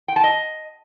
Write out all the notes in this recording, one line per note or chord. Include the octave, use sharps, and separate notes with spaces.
G5
A5
D#5